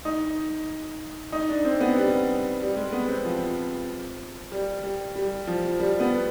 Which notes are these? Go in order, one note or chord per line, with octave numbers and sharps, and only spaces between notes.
D#4
D#4
D4
C4
B3
G3
G3
G#3
B3
C4
F3
G3
G3
G3
F3
G3
B3